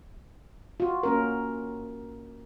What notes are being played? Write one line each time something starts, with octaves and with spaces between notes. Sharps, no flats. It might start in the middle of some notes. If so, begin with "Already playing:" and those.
F4 F#4
A#3 C#4 A#4